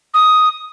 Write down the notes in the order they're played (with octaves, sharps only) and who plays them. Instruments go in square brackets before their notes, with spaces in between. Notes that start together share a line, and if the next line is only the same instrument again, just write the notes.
[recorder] D#6